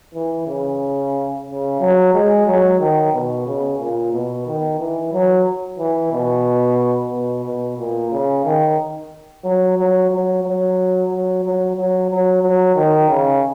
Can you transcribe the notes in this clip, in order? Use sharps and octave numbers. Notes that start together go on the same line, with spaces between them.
E3
C#3
C#3
F#3
G#3
F#3
D#3
B2
C#3
A#2
B2
D#3
E3
F#3
E3
B2
B2
B2
A#2
C#3
D#3
F#3
F#3
F#3
F#3
F#3
F#3
F#3
F#3
F#3
D#3
C#3